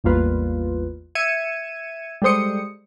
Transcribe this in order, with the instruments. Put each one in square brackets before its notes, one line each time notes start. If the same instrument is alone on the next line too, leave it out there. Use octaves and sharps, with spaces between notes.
[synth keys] A1 E2 G3 A#3 F4 B4
E5 G#6 C#7 D#7 E7
G3 G#3 A4 C5 D#6 C#7